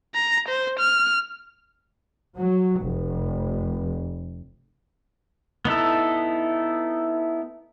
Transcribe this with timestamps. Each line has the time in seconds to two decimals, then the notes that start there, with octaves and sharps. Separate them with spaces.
0.14 A#5
0.48 C5
0.79 F6
2.35 F#3
2.81 F1
5.65 B3 D#4 E4 A4